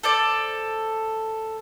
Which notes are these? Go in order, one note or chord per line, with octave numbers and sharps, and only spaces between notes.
A4 C5 D5